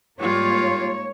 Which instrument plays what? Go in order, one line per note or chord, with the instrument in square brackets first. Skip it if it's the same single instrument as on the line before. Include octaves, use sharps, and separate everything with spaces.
[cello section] G#2 A#3 C#5 [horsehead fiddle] G3 F4